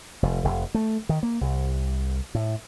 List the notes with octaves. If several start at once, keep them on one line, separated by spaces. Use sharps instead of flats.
F1
F1
A3
D#3
A#3
C2
A2